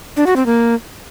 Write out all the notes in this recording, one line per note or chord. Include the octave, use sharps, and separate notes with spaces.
D4
F#4
C4
A#3